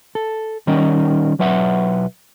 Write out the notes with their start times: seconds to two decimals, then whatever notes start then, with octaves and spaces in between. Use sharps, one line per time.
0.15 A4
0.67 D#3 G3 C#4 D#4 A#4
1.39 B1 F#3 B4 E5 F#5